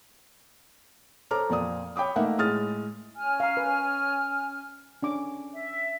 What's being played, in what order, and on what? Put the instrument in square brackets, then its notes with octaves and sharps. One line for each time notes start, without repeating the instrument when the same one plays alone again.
[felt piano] A4 C5 C#5 A#5 D6 F6
F2 A#2 D5 D#6
C#5 G5 B5 D6 D#6
A3 A#3 D#4 A#4 E5 F#5
A2 G#3 D#6 F6 A6
[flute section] C#4 G#5 F6
[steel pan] F5 A#5
B4
C#4 D4 D6
[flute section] E5